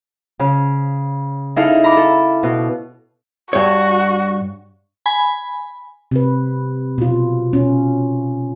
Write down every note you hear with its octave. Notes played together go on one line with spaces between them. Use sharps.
C#3
D#4 E4 G#4 A4 F5
A#5 B5 D6
A4
B2
G2 F#4 C#5
G#5 B5
C3 B4
B2 F4
B2 C#4